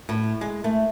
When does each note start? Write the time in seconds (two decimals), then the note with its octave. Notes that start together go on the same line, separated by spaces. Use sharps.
0.09 A2
0.41 G#3
0.64 A3